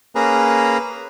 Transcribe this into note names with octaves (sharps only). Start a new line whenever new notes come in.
A#3 C#4 G#4 B4 A#5